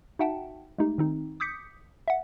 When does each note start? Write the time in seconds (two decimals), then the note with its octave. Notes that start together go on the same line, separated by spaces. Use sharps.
0.19 D#4 F#4 E5 F#5 G5 A5
0.78 G#3 A3 D#4 G4
0.98 D#3 C4 D#4
1.40 D6 D#6 G6 B6 C#7
2.08 E5 F#5